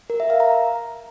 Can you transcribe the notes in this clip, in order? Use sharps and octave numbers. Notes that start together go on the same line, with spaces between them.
A#4
E5
F5
A#5